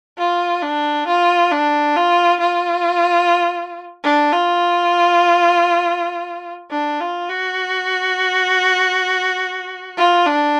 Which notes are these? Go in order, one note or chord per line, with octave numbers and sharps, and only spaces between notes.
F4
D4
F4
D4
F4
F4
D4
F4
D4
F4
F#4
F4
D4